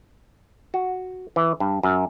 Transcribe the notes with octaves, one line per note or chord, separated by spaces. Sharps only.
F#4
E3
G2
F#2